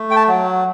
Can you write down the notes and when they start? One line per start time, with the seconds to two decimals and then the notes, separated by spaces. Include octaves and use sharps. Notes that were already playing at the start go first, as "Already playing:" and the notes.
Already playing: A3
0.11 G5
0.16 A5
0.28 F#3